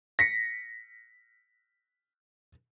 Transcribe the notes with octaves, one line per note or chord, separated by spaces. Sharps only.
A#6 B6 C#7